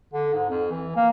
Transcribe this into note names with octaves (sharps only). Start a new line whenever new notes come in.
D3
G#2
F2
E3
A#3